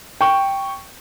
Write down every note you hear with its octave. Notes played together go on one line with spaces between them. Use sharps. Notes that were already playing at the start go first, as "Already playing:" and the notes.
G5 C#6